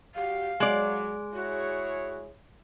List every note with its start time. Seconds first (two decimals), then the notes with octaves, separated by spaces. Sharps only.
0.15 G3 F#4 G4 F5
0.60 F#3 G#3 D5
1.34 E4 F#4 G#4 C#5